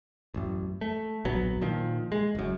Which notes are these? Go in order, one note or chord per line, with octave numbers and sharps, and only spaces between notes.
A1 F#2
A3
D1 A#1 F#3 B3
A#2 D#3 F3
G#3
F#1 F#2